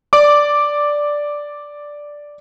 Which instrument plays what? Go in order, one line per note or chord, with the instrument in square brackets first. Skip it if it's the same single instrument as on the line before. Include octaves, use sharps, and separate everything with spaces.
[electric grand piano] D5 D6